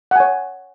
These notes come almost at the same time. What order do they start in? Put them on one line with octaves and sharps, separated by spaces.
F#5 G#5 C#5